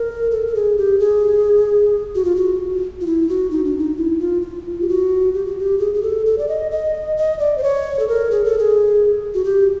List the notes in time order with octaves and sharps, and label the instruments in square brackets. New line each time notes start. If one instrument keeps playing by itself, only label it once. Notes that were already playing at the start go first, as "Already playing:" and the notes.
Already playing: [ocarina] A#4
A4
A4
G#4
G4
G#4
F#4
F4
F#4
F4
E4
F#4
D#4
D4
D#4
E4
F4
F4
G4
F#4
G4
F#4
G4
G#4
G#4
A4
A4
D5
D#5
D#5
D#5
D5
C5
C#5
A4
A#4
G#4
A4
G#4
F#4
G4